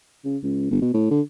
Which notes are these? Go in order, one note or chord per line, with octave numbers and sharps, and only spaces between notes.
C#3
C#2
G1
B2
A2
D3